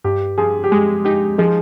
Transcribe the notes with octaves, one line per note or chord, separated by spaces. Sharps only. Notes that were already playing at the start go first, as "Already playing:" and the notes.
G2 G4
F3 G#4
G4
G#3 G#4
D#4 G4
F3 G#3